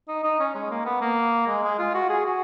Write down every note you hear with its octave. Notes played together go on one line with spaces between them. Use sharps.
D#4
D#4
C#4
G#3
A#3
B3
A#3
G#3
G#3
F4
F#4
G#4
F#4